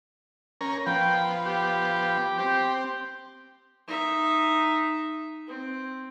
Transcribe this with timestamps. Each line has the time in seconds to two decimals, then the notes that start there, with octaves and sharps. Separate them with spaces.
0.61 C#4 A#4
0.86 F3 B3 G5
1.45 G4
2.38 C4 G4
3.88 D#4 E5
5.47 C4